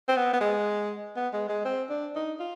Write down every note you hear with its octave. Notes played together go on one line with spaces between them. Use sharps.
C4
B3
B3
G#3
B3
G#3
G#3
C4
D4
D#4
F4